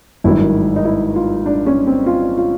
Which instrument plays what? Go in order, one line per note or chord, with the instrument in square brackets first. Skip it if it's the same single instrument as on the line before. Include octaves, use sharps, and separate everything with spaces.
[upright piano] G#1 G2 D#3 F#3 E4
D#4
E4
F4
D4
C#4
C4
F4
F4